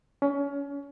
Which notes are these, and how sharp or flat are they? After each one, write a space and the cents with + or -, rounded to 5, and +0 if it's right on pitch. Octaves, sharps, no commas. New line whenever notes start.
C#4 +30